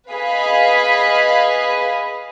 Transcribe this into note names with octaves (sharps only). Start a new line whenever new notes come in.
G#4 B4 D#5 F5 B5